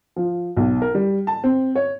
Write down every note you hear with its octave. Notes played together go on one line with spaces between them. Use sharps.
F3
B1
A#4
G3
A5
C4
C#5